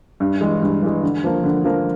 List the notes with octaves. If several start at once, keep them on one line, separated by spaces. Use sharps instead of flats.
G2
E3 G#3
G2
E3 G#3
D3
F3 A#3
D3
F3 A#3